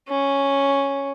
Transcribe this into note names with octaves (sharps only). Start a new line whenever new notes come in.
C#4